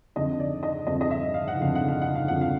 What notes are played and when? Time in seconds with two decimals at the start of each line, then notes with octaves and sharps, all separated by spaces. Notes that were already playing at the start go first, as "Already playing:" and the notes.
0.16 F2 D3 F3 D#5
0.40 D5
0.63 D#5
0.87 F2 D3 F3 D#5
1.01 D#5
1.11 E5
1.34 F5
1.48 F#5
1.58 F2 D3 F3 F5
1.75 F#5
1.88 F5
2.02 F#5
2.15 F5
2.28 F2 D3 F3 F#5
2.41 F5